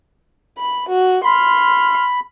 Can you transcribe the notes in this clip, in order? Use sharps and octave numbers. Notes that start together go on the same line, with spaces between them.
B5
F#4
B5 C6 F6